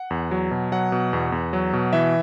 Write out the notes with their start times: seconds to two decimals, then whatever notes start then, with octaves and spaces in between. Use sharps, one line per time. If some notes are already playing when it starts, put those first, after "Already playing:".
Already playing: F#5
0.10 E2
0.31 F#3
0.51 B2
0.72 F#3 F#5
0.92 B2
1.13 E2
1.32 E2
1.53 F#3
1.73 B2
1.93 E3 E5